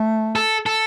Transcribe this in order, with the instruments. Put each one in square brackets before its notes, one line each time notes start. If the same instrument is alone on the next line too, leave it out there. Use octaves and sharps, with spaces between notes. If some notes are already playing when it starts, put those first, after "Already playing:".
Already playing: [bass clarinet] A3
[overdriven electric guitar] A4
A4